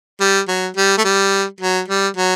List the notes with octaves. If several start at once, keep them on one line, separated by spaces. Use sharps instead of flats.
G3
F#3
G3
A3
G3
F#3
G3
F#3